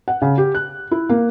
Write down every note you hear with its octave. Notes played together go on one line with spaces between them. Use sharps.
F#5
C#3
G4
F#6
E4
A#3